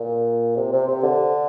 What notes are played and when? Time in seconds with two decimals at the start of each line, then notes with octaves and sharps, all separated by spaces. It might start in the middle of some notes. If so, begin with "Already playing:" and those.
Already playing: A#2
0.57 C3
0.73 C3
0.88 C3
1.03 D3